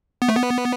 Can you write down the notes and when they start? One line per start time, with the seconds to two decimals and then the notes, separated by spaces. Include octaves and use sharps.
0.22 B3
0.28 A3
0.35 B3